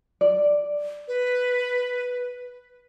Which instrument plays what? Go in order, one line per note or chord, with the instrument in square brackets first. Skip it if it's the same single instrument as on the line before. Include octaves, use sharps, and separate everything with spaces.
[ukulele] D5
[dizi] B4